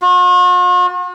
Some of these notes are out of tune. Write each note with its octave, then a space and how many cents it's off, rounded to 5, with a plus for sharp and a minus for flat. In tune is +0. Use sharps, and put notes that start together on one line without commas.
F#4 -45